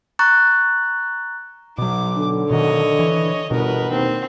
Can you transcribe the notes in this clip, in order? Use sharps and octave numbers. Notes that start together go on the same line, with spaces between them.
A#5 C#6 F#6 A6
B2 F#3 D6
D3
B2 D#3 C#5 D#5
E3
G1 B2 A#4 B4
D#2 C4